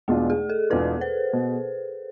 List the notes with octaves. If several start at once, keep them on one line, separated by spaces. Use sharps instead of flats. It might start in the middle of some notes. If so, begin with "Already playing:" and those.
E2 B2 G#3 A3 D4 F4
G#4
A4
E2 B2 G#3 D4 F4 B4
C5
B2